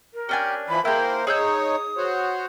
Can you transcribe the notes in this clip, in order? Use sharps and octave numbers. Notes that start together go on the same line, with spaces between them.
A#4
C#4 D4 G4 G#5
E3 F3 B5
A#3 E4 G#4 A#4 C5 G5
D#4 G#4 C#5 D#6 E6 G6
F#4 C5 C#5